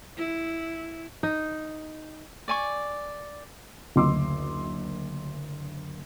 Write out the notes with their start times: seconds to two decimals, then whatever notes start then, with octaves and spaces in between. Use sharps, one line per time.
0.17 E4
1.23 D#4
2.48 D5 G#5 C#6
3.96 F#1 D2 D#5 C6 D6 E6